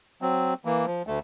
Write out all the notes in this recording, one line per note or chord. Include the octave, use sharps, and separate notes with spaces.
F#3 C4
E3 A#3
F3
D2 A3